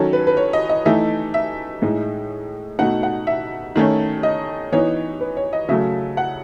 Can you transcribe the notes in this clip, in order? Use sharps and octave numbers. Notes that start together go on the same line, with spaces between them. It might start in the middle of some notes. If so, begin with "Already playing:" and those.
Already playing: D#3 F#3 C#4 A4
B4
B4
C#5
D#5
D#5
E3 A3 D#4 E5
E5
A2 G#3 D#4
B2 A3 D#4 F#5
F#5
E5
D#3 A3 C#4
D#5
E3 B3 D#4 C#5
B4
C#5
D#5
C#3 F#3 A3 E5
F#5